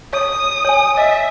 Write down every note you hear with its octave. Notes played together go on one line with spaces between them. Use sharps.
C#5 D#6
C#5 G#5
D#5 E5